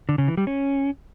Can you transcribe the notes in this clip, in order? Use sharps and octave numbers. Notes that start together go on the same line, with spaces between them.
D3
C#3
E3
G3
C#4